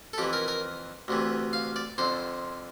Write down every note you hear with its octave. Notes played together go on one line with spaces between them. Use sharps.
A4
F2 E3 G4
A#4
A#4
D2 C3 E3
F5
D5
F2 D3 C5